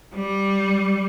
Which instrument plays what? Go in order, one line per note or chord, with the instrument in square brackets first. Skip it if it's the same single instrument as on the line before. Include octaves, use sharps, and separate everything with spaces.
[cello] G3